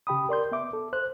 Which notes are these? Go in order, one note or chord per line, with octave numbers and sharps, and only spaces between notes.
C#3 G4 G5 B5 D#6
A#4 D5 C6 G6
B3 E5 D6
A4
C5 F#6